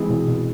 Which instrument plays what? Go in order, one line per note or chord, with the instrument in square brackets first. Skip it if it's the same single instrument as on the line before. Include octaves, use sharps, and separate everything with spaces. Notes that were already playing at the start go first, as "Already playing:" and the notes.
Already playing: [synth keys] E3 G#3 C4 E4 G#4
[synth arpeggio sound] B2
B2